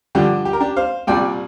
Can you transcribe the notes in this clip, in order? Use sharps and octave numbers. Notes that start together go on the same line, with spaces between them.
G2 D3 F3 D4 G4
G4
A#4
D4 G4
C5 F5
C2 A#2 G3 D5 G5